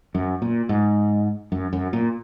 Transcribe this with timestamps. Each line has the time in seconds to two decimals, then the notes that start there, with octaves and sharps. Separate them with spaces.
0.15 F#2
0.42 A#2
0.69 G#2
1.52 F#2
1.73 F#2
1.93 A#2